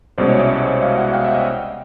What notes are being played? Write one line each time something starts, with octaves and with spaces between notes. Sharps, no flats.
C2 B2 G#3 C#4 C5 D5
C#5 D#5
D5 E5
D#5 F5
E5 F#5
F5 G5
E5 F#5
D#5 F5